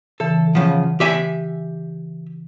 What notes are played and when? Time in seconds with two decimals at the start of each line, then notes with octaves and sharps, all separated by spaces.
0.20 C#3 E3 A4
0.55 C#3 F3 F#5
1.00 G4 E5 G#5